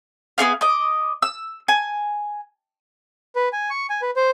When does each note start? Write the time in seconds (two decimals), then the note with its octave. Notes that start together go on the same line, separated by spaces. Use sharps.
0.38 B3 C4 G#4 F5
0.61 D#5 D6
1.22 E6
1.68 G#5
3.35 B4
3.53 G#5
3.70 C#6
3.90 G#5
4.02 B4
4.16 C5